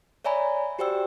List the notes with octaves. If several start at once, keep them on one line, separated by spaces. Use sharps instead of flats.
C#5 D5 E5 G#5 A#5 B5
F#4 G4 C5 D5 G5 E6